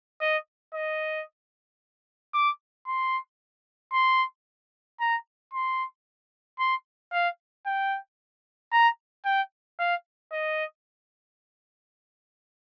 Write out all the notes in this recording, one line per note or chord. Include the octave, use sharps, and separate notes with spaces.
D#5
D#5
D6
C6
C6
A#5
C6
C6
F5
G5
A#5
G5
F5
D#5